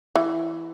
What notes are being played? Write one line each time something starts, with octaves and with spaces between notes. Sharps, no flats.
E3